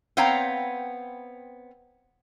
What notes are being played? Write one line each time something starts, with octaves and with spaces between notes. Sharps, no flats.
B3 C4 C#5 F5 G5 A#5